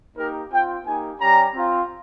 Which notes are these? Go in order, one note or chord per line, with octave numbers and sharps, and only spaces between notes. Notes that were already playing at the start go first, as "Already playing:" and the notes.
A#3 D#4 G4 A#4
C4 F4 G5
A#3 D#4 G4 G#5
G3 C#4 G4 A#5
C4 F4